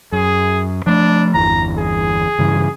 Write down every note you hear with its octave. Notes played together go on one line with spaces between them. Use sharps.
F#2 G#4
F3 A3 D4
G1 E2 E3 A#5
G#4
G2 C#3 E3